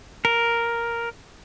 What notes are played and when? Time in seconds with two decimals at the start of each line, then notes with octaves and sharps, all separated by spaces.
0.25 A#4